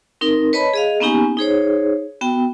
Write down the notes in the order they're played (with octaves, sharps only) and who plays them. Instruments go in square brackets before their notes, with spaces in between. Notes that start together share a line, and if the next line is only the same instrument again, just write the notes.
[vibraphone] C4 D#4 A#4
B4 C#5 D#5 A5 B5
G#4 D#5 F5
A#3 B3 C#4 D#4 G4 G#5
D#4 G#4 C5 C#5
B3 F#4 G5